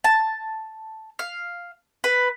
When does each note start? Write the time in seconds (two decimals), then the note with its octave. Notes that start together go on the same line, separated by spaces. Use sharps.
0.04 A5
1.19 F5
2.04 B4